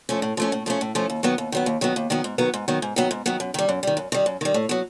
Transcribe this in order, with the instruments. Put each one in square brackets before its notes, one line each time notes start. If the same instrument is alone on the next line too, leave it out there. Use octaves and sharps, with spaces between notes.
[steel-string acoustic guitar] F3 A3 C#4
A2
F3 A3 C#4
A2
F3 A3 C#4
A2
F3 A3 C#4
D#2
D#3 F#3 B3
D#2
D#3 F#3 B3
D#2
D#3 F#3 B3
D#2
D#3 F#3 B3
G#2
D#3 F#3 B3
G#2
D#3 F#3 B3
G#2
D#3 F#3 B3
G#2
D#3 F#3 B3
F#2
D#3 G3
F#2
D#3 G3
F#2
D#3 G3
F#2
D#3 G3
A2
F#3 B3